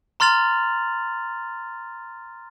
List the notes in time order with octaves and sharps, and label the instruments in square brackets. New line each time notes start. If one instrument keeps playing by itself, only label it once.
[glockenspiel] A#5 C6 F6 A6 F7 F#7